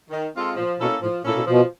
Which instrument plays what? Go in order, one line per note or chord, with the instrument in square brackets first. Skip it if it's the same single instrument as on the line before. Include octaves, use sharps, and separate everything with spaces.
[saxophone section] D#3
G#3 C4 F4 A4
[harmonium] A#2 [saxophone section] F3
[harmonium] B2 [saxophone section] A#3 C#4 E4 A4
[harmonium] A2 [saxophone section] F3
[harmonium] A#2 [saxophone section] A#3 C#4 E4 A4
[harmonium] B2
[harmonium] B2 [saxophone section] F3